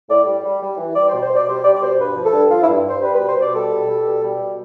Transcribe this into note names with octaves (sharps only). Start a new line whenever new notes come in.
A2 D5
G3
G3
G3
E3
G3 D5
C5
B2
C5
B2
D5
G3 C5
G3 D5
D5
B2 C5
G2 B4
F3
A4
G2
F3 F4
E4
G2
G2 C5
G3 B4
B4
B2
C5
B2 D5
G3 A4
B2
G3
B2
G3
B2